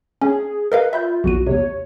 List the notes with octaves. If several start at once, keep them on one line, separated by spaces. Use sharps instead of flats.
C#4 G#4
A#4 B4 D#5 F5
F4 E5 B5 G6
B1 E2 F#4 D#7
E2 C3 C#5